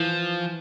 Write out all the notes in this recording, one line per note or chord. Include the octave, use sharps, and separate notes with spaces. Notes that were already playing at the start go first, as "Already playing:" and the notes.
Already playing: E3 F3